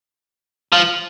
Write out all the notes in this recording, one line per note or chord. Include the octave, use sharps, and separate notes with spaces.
F3